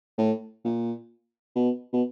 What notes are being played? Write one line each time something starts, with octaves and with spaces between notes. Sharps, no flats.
A2
A#2
B2
B2